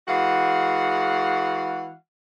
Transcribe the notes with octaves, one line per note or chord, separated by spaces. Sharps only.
E3 G#3 F#4 F5 F#5